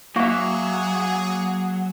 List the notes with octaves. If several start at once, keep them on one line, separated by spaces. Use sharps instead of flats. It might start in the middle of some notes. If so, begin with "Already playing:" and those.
F#3 A#3 F#4 G#4 E5